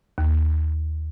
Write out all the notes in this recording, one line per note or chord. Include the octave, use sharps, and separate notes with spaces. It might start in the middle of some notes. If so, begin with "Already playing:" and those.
D#2